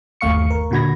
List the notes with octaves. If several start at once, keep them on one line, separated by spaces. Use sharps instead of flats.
G1 D#2 A3 F5 C#6 C#7
A#4
A#2 D3 F#4 B5 G#6 A#6